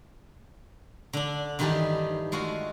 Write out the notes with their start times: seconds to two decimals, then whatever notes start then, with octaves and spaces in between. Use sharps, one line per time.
1.13 D3 D4
1.59 G2 D#3 E3 G4 G#4 A5
2.32 G#3 A3 F4 F#4